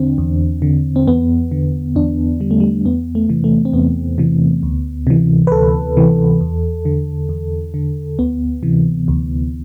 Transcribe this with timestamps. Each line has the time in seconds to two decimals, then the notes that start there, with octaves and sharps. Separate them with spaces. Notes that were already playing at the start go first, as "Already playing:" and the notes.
Already playing: E2 D3 C4 D4
0.18 E2
0.62 D3
0.96 C4
1.07 E2 B3
1.51 D3
1.95 E2 D4
2.40 D3 G3
2.51 A3
2.60 G3
2.85 E2 B3
3.15 A3
3.29 C3 E3
3.44 A3
3.65 C4
3.73 E2 B3
4.18 C3 E3
4.63 D2
5.07 C3 E3
5.47 B4
5.52 D2 A4
5.97 C3 E3
6.41 E2
6.85 D3
7.29 E2
7.74 D3
8.19 D2 B3
8.63 C3 E3
9.08 D2